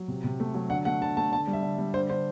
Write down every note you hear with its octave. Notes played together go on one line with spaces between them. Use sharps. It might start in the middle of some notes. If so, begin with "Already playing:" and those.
Already playing: F#3
C3
C3
A3
F#3
D3 F#5
A3 F#5
D3 A5
A3 A5
D3 A5
G3
E5
D3
G3
D3 C5
D3 C5